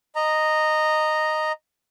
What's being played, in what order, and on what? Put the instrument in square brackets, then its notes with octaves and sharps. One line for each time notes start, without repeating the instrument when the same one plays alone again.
[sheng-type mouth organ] D#5 A#5